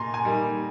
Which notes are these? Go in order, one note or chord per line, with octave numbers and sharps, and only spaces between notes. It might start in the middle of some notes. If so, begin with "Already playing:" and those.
Already playing: A#2 G#5 A#5 C6
G#5
D#3 G3 A#3